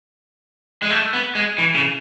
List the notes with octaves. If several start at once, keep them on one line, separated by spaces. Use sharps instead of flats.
G#3
A3
B3
G#3
E3
C#3